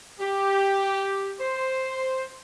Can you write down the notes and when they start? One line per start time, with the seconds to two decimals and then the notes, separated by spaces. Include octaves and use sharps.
0.20 G4
1.40 C5